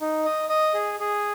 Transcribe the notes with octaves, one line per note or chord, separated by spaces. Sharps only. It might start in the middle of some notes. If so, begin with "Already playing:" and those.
D#4
D#5
D#5
G#4
G#4